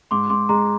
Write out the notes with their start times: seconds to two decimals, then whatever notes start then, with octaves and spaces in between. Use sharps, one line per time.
0.11 G#2 C6 D6
0.30 G#2 C6 D6
0.49 G#3 A#5 C6